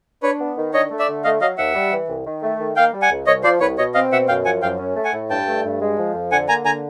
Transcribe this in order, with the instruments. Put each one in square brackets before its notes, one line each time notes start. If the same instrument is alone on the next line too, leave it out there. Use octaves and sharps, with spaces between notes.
[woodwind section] D4 [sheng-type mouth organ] B4 C#5
[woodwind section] B3
D#3
[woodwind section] D4 [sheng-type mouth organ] C#5 D#5
[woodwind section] A3
[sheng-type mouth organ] D5 E5
[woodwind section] D3
[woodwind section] A3 [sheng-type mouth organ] D#5 F5
[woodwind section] F#3 [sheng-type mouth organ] D#5 F5
[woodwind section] D#2 [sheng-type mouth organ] E5 F#5
[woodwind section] G3
E3
C2
D#3
A3
D#3
[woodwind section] A#3 [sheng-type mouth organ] F5 G5
[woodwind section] G3
[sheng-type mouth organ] F#5 G#5
[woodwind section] C#2
[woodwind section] C2 [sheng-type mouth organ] C#5 D#5
[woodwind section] F3 [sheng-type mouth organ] C5 D5
[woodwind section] C2 [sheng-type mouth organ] B4 C#5
[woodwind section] B2 [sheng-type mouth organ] C#5 D#5
[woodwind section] C4 [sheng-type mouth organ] D#5 F5
[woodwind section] B2 [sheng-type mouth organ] E5 F#5
[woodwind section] F#2 [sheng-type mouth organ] F5 G5
[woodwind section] F3 [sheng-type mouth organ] F#5 G#5
[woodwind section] F#2 [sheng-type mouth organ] F5 G5
[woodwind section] C#4
A3
[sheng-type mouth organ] F#5 G#5
[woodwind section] A2
[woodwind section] G2 [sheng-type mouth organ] G5 A5
[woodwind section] A3
G2
G#3
F3
F2
[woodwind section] D3 [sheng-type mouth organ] F#5 G#5
[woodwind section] A#3 [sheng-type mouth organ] G#5 A#5
[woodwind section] D3 [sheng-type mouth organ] G#5 A#5